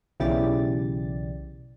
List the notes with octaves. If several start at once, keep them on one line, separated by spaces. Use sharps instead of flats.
B1 C#3 E3 G4 D5 A6